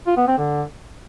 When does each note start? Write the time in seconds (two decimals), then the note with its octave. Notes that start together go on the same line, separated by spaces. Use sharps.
0.07 F4
0.17 B3
0.28 C4
0.38 D3